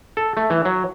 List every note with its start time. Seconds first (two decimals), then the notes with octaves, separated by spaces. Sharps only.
0.17 A4
0.37 A3
0.50 E3
0.65 F#3